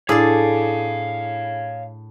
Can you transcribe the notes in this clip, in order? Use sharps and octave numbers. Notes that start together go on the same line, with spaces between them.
A2 D4 E4 G#4 C#5 D5 F5